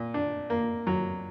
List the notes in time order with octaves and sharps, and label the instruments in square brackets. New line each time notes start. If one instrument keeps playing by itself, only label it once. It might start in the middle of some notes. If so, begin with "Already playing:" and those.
Already playing: [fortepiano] A#2
D4
A#3
F#3